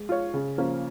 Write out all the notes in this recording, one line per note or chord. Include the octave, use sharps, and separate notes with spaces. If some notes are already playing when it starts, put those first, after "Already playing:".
Already playing: G#3
F4 C#5
C#3
F3 A#3 C#4